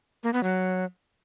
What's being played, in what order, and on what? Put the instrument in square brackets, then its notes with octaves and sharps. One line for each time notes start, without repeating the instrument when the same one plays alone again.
[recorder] A#3
B3
F#3